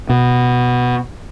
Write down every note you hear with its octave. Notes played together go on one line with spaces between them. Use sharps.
B2